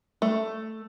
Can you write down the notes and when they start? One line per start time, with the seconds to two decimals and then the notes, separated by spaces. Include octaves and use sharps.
0.22 A3